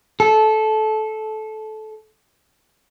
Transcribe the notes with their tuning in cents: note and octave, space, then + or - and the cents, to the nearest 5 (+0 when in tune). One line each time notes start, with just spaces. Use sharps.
A4 -20